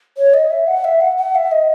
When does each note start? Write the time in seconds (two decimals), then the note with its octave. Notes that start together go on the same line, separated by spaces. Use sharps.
0.17 C#5
0.34 D#5
0.50 E5
0.67 F#5
0.84 E5
1.01 F#5
1.17 F#5
1.35 E5
1.51 D#5